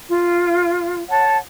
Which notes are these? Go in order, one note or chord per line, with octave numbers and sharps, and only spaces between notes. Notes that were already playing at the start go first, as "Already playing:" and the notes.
F4
C#5 F#5 A5